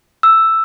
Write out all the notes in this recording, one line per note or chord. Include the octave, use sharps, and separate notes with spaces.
E6